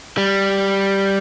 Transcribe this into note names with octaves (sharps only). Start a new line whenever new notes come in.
G3